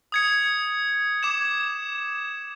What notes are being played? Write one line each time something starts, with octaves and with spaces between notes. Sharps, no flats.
D#6 G#6 C#7
D6 G#6 E7